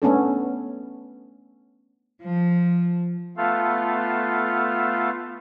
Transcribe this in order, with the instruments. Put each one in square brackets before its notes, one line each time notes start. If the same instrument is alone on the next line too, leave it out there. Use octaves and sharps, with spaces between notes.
[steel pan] A3 B3 C#4 D4 A4
[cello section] F3
[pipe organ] A3 B3 F4 A4 F5